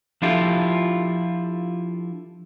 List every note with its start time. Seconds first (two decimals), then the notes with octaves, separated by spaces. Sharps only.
0.22 F3 D4 E4 F4 G4 A4